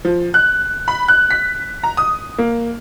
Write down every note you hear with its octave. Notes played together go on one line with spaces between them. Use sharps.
F3
F#6
B5
F#6
B6
A#5
D#6
A#3